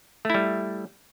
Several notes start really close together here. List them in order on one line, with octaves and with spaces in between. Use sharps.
A3 E4 G3